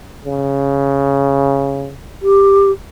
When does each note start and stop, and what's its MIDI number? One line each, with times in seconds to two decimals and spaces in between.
0.24 1.94 49
2.22 2.71 67